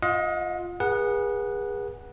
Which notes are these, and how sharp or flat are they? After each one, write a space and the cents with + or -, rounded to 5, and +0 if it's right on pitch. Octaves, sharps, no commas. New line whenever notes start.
F4 +0 D#5 +20 F#5 -45
G#4 -25 B4 -40 F#5 +0